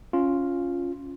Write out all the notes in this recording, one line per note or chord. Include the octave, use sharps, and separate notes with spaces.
C#4 F4